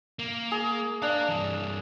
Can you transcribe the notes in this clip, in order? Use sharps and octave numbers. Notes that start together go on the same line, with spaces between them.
A#3
G#4
D4 A#4 F5
G2 E3